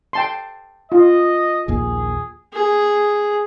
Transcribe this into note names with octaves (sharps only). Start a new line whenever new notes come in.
G5 A5 C6
F4 D#5
A#1 D#2 A#3 G#4
G#4